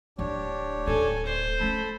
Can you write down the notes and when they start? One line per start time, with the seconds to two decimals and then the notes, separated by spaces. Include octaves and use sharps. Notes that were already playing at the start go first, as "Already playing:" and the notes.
0.18 D1 D4 E4 G4 C#5
0.86 D1 D#2 A4 G#5
1.26 C5
1.60 A3 C#4 A4 B5